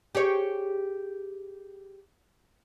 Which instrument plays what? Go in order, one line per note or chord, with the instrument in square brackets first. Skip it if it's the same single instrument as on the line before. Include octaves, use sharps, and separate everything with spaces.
[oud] G4 G#4 C#5